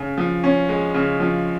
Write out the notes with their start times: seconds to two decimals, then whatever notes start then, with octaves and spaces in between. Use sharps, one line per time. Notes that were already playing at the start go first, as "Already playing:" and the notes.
Already playing: C#3
0.18 F3
0.44 C#4
0.69 G#3
0.94 C#3
1.20 F3